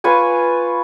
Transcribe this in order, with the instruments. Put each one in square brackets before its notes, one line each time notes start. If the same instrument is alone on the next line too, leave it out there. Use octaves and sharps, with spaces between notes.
[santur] F4 B4 C#5 G#5